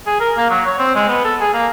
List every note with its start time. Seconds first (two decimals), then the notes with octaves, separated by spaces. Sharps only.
0.07 G#4
0.20 A#4
0.37 A#3
0.50 F#3
0.66 C#5
0.79 C4
0.95 G#3
1.08 B3
1.24 A4
1.41 G#4
1.54 A#3